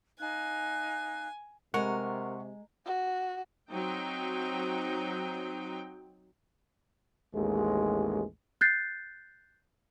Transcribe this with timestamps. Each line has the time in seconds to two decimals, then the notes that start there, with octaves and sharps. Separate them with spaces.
0.19 D#4 F5 G#5 F#6
1.74 C3 G#3 A#4 F#5 C#6
2.86 F#4
3.72 F#3 C4 D#4 G5
7.34 A1 D#2 G#3
8.61 F#6 G6 A6 C7